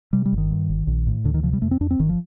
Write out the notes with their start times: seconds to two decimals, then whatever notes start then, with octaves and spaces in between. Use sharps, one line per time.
0.13 C3 G3
0.26 G3
0.32 G1
0.38 D#3
0.50 G2
0.69 G1
0.87 A#1
1.07 A2
1.24 D2 D3
1.34 D#3
1.43 C3 F3
1.53 G3
1.62 F2 A3
1.71 C4
1.81 F2 D4
1.91 C4
1.99 G1 D#3
2.09 F3